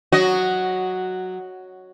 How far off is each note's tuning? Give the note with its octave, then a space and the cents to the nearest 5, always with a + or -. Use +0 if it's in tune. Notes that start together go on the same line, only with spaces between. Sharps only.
F#3 +0 F#4 +0 D#5 +0